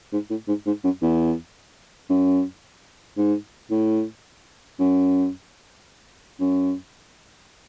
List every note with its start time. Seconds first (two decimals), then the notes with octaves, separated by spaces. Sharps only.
0.13 G#2
0.30 A2
0.48 G#2
0.66 G#2
0.84 F#2
1.02 E2
2.09 F#2
3.18 G#2
3.71 A2
4.79 F#2
6.40 F#2